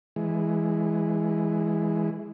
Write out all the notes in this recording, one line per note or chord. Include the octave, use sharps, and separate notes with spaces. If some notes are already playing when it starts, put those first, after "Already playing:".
E3 G#3